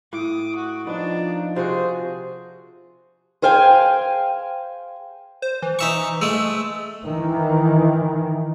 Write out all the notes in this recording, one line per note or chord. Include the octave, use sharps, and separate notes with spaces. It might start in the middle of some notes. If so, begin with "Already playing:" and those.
A2 D6 D#6
F#4
F3 B3 D4 D#4
C3 F4 F#4 G#4 C5
G#4 C5 F5 G5 G#5
C5
E3
D#4 E5 C#6
G#3 A3 E6
D#3 E3